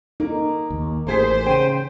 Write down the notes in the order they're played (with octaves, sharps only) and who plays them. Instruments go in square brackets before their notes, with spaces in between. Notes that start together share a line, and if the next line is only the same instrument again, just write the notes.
[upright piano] A#3 [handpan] D#4
[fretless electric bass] D#2
[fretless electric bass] A1 [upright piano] A#3 G#4 B6 [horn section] C5
[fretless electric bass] C#3 [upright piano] G5 C6 D#7